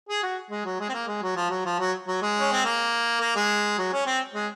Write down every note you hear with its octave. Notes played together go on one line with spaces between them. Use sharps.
G#4
F#4
G#3
F#3
G#3
C4
A#3
G#3
F#3
F3
F#3
F3
F#3
F#3
G#3
C#4
C4
A#3
A#3
G#3
F#3
C#4
C4
G#3